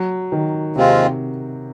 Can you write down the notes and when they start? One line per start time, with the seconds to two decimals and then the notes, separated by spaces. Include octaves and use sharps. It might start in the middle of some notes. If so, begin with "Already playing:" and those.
Already playing: F#3
0.32 D#3
0.76 D#2 C3 D#3 G#3 C4 F4